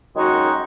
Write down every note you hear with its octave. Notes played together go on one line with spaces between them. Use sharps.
F#2 D#3 G#3 D#4 F#4